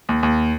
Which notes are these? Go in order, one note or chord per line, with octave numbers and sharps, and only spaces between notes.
D#2
D#2